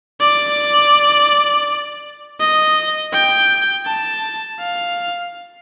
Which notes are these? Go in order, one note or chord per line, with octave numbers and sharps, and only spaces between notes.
D5
D#5
G5
A5
F5